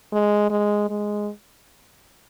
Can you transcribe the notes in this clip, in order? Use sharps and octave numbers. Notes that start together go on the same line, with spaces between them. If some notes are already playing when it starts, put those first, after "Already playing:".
G#3
G#3
G#3